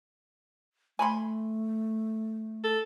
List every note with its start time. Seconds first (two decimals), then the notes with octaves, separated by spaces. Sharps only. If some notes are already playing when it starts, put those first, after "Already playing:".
0.99 A3 G#5 B5 C6
2.64 A4